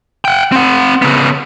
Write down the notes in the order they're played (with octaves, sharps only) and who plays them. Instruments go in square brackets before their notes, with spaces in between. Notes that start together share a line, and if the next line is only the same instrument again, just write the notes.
[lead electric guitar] F#5 G5
C4 F#5
C#3 B3